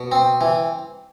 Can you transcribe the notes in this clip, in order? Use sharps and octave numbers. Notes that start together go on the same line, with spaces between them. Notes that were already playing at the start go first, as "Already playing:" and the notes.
Already playing: B2
C4
E3